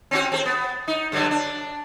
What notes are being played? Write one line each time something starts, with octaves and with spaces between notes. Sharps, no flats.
C4 C#4 F#4
C4 G#4 C5
B3
D#4
G2 D3 F#3
D4